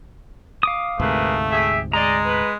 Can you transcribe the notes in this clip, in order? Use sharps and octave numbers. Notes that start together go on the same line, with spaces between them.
F5 D6 D#6
D2 G#2 C3 A3 G#4 A#4 B4
G4 G#4 E5
G#3 G#4 D5 D#5 A#5
B4